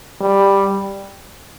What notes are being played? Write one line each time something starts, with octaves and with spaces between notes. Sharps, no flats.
G3